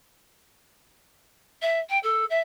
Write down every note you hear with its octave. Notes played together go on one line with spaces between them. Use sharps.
E5
G5
A4
E5